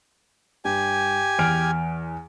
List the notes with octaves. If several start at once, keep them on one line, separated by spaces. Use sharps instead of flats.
G2 G4 G#5
E2 F6 D7